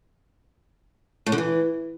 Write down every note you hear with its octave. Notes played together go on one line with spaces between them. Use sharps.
A2
D3
E3